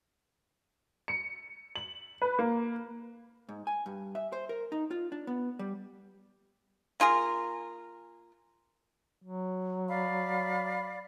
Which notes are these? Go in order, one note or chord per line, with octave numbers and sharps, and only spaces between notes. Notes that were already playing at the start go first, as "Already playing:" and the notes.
C#7
F#7
B4
A#3
G#2
G#5
G2
E5
C5
A#4
D#4
F4
D4
B3
G3
A#3 F4 G#4 A#4
F#3
D5 F5 B5